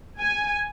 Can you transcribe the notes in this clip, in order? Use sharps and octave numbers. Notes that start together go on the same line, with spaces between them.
G#5